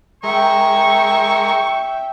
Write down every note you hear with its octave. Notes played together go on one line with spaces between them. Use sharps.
G#3 A#4 E5 G5 C#6